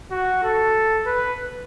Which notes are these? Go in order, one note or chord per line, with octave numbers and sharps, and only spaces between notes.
F#4
A4
B4